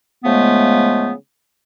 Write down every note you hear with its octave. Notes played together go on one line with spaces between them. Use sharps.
C#3 F3 G#3 A3 B3